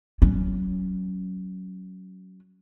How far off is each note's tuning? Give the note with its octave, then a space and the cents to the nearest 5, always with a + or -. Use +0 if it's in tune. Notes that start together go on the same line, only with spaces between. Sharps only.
F#3 +10 C#4 +0